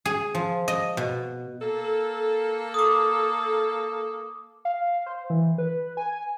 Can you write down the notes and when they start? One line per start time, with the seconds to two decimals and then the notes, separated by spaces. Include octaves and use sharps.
0.05 G#4
0.35 F3
0.68 D#5
0.97 B2
1.61 A#3 A4
2.74 D6 D#6
4.65 F5
5.06 C5
5.30 E3
5.58 B4
5.97 G#5